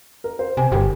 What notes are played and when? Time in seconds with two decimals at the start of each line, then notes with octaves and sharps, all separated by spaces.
0.24 A#4
0.39 C5
0.57 C3 G#5
0.72 G1 G4 A#4